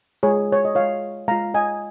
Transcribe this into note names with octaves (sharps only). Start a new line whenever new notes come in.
G#3 F4 G#4 C#5
C#5
D#5
G#3 F4 C#5 F5
G#3 F4 F5 A#5
D#5 G#5